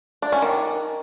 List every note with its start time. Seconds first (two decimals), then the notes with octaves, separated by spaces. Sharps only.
0.22 D4
0.32 C#4
0.42 D#3